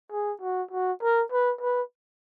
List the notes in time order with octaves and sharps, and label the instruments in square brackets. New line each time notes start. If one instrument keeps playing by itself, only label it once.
[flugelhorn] G#4
F#4
F#4
A#4
B4
B4